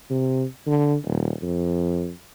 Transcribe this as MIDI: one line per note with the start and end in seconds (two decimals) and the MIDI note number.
0.10 0.44 48
0.67 0.95 50
1.05 1.32 27
1.42 2.11 41